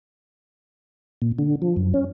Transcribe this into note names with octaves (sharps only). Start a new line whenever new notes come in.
A#2
D3
F3
F#2
C#4